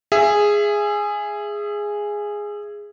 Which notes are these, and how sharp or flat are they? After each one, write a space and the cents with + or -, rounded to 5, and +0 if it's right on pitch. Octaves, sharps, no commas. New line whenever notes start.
G#4 -5 E5 +25